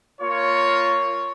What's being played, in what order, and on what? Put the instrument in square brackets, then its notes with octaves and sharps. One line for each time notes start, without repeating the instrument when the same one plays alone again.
[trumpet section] A#3 F4 C#5